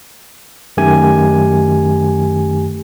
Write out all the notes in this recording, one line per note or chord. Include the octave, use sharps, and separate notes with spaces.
F#2 D#3 A3 G4 G#5